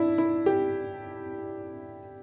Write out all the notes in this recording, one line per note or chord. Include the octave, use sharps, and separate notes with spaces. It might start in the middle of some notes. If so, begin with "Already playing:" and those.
Already playing: D4 E4
E4
G4